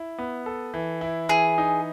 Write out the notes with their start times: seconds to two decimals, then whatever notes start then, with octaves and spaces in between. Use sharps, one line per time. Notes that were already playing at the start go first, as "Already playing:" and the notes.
Already playing: E4
0.18 B3
0.46 A4
0.74 E3
1.01 E4
1.29 E3 G#4
1.58 D#4